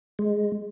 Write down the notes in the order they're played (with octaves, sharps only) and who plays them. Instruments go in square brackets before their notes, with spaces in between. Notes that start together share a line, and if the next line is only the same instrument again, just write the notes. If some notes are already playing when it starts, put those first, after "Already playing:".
[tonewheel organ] G#3